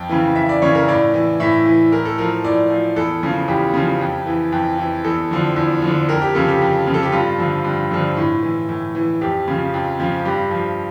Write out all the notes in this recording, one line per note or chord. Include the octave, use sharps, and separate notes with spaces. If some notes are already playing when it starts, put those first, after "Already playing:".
Already playing: F2 G5
C#3 E3
F2 E5
D5
C#3 E3 C#5
A#4
A2 D5
E3
A2 E5
E3
A2 A#4
A4
F3 A#4
A2 D5
F3
E2 A4
C#3 F3
E2 G4
C#3 F3
F2
E3
F2
E3
E2 A4
D3 F3
E2
D3 F3
F2 A#4
G4
C#3 F3 A4
G4
F2
C#3 F3
A4
G4
G2 F4
D3 F3
G2
D3 F3
A2
E3
A2
E3
F2 G4
C#3 F3
F2
C#3 F3
G2 G4
F3